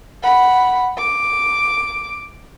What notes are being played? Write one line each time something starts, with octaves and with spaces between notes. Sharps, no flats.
F#5 B5
D6